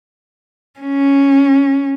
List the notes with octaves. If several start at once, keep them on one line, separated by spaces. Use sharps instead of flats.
C#4